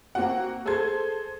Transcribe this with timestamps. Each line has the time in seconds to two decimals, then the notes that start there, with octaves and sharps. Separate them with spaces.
0.15 A#3 C4 F#4 F#5
0.66 G#4 A4 C5 C6 G#6